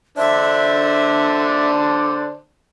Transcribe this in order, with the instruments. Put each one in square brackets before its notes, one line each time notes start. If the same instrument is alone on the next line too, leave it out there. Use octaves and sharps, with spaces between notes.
[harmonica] D3 D4 C5 [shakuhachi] E5